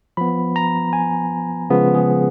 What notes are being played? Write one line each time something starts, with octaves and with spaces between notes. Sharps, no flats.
F3 B3 B5
A#5
G#5
C#3 F3 G#3 B3
G#4